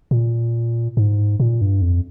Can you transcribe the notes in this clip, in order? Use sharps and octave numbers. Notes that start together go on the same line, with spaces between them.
A#2
G#2
A#2
G2
F2